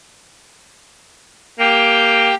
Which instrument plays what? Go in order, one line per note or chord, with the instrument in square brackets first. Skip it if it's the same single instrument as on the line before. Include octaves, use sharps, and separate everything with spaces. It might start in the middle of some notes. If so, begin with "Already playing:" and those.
[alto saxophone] A#3 [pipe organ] G4 G5